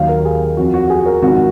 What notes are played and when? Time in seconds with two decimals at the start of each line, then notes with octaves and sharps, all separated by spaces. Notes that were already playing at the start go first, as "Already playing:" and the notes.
Already playing: D#2 D#3 F#3 F5
0.09 A#4
0.25 G#4
0.57 F2 F3 F#4
0.74 F#4
0.90 G#4
1.06 A#4
1.22 G#1 G#2 F3 F#4